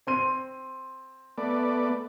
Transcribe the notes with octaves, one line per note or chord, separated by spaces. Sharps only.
C4 C6 D#7
A3 B3 D5